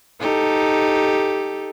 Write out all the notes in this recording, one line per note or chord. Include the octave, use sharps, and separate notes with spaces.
D#4 G4 A4